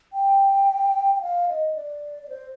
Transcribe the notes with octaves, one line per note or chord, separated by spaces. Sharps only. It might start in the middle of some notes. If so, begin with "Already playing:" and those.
G5
G5
F5
D#5
D5
D5
C5